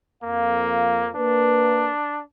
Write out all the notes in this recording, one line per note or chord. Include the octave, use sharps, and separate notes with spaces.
F2 A#3 F5
A#3 D4 B4